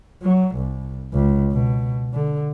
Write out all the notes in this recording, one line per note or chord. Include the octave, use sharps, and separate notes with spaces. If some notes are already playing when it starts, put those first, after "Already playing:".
F#3
C2
C#2
B2
D3